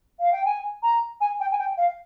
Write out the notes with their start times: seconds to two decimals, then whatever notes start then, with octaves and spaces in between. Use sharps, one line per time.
0.20 F5
0.32 G5
0.45 G#5
0.83 A#5
1.20 G#5
1.40 G5
1.52 G#5
1.58 G5
1.77 F5